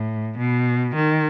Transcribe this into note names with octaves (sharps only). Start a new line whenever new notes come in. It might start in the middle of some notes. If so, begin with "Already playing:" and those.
Already playing: A2
B2
D#3